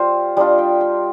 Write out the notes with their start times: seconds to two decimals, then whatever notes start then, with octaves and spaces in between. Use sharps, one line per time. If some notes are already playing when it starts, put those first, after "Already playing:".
Already playing: G3 F4 C5
0.37 G3 D4 F4 D#5
0.58 G5
0.81 G5